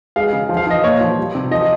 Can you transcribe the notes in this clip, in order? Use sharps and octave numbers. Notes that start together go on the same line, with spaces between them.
G#3 F5
C#3
F3
F5
F3 D#5
A#2 C#5
F3
G3
C3
F3 D#5